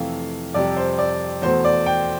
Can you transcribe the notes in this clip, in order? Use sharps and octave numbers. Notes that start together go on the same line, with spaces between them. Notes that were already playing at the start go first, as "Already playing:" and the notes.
Already playing: F2 C3 E3 A3 F5
F2 C3 G3 D5
C5
D5
E2 B2 A3 C5
D5
G5